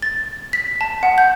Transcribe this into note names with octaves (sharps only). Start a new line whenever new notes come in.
A6
B6
A5
F#5
G6